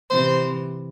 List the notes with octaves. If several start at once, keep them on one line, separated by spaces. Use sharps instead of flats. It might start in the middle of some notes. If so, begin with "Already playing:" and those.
C3 E3 C5